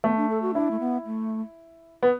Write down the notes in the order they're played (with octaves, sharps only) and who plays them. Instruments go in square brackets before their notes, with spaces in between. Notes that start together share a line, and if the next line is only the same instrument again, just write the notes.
[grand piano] A3 [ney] B3
[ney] D4
A4
F#4
[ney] D4 [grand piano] E4
[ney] A3
B3
A3
[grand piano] B3